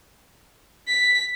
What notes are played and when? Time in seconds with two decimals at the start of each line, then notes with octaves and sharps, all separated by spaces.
0.88 B6